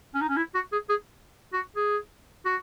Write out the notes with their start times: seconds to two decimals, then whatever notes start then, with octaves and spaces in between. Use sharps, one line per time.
0.14 C#4
0.21 D#4
0.29 C#4
0.36 E4
0.54 F#4
0.72 G#4
0.89 G#4
1.53 F#4
1.76 G#4
2.45 F#4